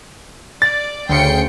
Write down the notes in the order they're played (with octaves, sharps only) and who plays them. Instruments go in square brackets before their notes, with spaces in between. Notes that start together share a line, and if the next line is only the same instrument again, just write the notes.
[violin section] D5 [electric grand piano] A6
[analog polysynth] D2 C#3 [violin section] G5 C6 C#7